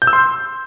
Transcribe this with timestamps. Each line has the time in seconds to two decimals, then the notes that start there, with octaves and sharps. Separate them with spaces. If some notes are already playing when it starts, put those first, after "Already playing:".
0.02 G6
0.07 E6
0.13 C6